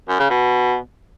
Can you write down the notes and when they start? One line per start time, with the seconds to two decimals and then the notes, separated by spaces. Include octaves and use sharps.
0.09 F#2
0.19 C#3
0.30 B2